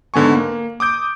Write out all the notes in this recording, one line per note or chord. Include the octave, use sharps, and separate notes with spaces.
G#2 D3 B3 G#5 C#6
A#3
D6 D#6 G6 D7